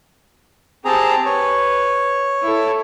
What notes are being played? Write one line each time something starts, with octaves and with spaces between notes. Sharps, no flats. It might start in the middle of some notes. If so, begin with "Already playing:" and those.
C4 G4 G#4 A5 A#5
B4 C#5
E4 A4